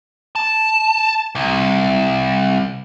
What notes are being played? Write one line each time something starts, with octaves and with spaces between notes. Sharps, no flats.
A5
C2